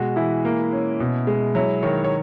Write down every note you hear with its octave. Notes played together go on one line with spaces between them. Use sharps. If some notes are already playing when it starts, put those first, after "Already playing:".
Already playing: B2 G#3 F#4
E3 E4
A#3
C#4
B2
G#3
F#3 E4
D#3 C#5
C#5